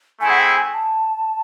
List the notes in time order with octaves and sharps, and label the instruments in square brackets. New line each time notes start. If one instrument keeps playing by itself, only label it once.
[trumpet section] A3 C4 E4 G#4 [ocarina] G#5
[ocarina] F#5
G5
G#5
A5